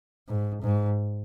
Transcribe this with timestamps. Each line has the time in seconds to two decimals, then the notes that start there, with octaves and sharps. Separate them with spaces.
0.29 G#2
0.62 G#2